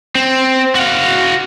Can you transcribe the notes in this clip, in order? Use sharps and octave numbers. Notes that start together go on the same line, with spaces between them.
C4
F#4 F5